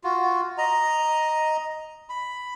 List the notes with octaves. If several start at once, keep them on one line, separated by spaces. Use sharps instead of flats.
F4 F#4
D#5 A#5
B5